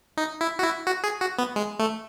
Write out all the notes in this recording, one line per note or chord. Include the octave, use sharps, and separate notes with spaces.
D#4
E4
F#4
E4
F#4
G#4
F#4
B3
G#3
A3